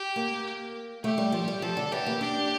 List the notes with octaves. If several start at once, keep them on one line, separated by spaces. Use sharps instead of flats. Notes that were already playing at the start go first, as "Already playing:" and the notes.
Already playing: G4
A#3
A3 G4
G3
F3
G3
F3 A4
D3
E3 G4
A#3
D4 G4